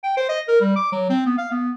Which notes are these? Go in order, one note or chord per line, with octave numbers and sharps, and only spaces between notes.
G5
C5
D#5
A#4
G3
D6
F#3
C4
B3
F5
B3